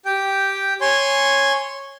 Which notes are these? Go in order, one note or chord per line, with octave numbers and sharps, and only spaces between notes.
G4 G5
C#5 G#5 C6